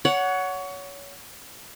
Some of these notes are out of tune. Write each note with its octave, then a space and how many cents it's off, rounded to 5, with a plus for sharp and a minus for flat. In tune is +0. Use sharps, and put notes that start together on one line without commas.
C#5 +25 F#5 +0